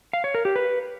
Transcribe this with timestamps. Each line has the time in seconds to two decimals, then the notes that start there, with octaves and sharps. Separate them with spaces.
0.13 F5
0.24 C#5
0.35 A#4
0.45 G4
0.56 B4